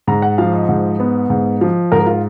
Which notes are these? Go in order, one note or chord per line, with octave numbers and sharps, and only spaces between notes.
G#2 A#5
F#5
F3 F5
D#5
G#2
B3
G#2
F3
G#2 A#4
F4